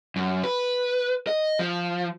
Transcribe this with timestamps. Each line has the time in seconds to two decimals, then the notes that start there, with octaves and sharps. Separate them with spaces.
0.16 F#2
0.44 B4
1.27 D#5
1.59 F3